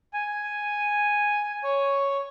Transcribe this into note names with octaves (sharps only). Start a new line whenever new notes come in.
G#5
C#5